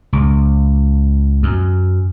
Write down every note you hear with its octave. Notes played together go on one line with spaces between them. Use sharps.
C#2
F#2